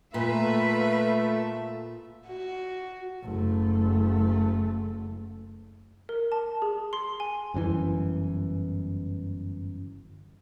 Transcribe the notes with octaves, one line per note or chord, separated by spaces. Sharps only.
A#2 A3 F4 B4 E5
F#4
F#1 A3
A#4
A5
G#4
C6
G#5
G1 F#2 B2 E3